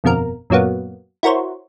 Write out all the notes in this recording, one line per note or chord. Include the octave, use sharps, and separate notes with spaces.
G1 F2 B2 A#3 A#4
F#2 A#2 F#3 A#3 B3
E4 F#4 A#4 C5 C#5